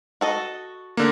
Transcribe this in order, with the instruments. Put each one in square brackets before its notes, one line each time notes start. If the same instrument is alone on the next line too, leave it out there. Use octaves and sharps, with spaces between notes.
[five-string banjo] F#4 A4 D#5
[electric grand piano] D3 A#3